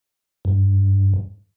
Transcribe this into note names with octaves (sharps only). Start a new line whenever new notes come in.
G2